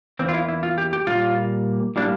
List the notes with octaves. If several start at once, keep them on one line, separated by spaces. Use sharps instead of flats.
E2 E3 A#3 C4
F4
E4
E4
F4
G4
G4
A#2 G3 A#3 F4
A2 G3 A#3 D4